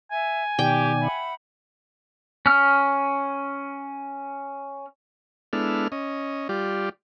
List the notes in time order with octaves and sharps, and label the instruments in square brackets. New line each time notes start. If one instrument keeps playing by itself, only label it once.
[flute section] E5 [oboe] G#5
[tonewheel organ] B2 D#3 D5 [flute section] G4 [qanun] G5
[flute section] E5 F#5 B5
[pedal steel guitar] C#4 F6
[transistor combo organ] G#3 B3 D4 E4 A4 F6
C#4 D#5
G3 F4 G4 D5